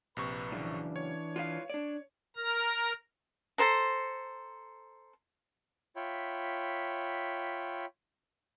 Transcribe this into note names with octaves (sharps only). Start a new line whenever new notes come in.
A#1 C3 B4 C#6
F#2 C#3 E3 D4
C#5
F4 B4 F5
D4 D5
A#4 F6 A#6
A4 A#4 C5 A#5
F4 C#5 E5 G5 B5